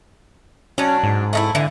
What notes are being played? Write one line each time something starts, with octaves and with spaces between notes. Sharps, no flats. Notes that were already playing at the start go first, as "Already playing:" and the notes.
F#3 C#4 D4
G#2
A3 D#4 E4
D3 E3